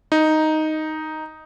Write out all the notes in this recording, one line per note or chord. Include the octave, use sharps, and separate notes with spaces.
D#4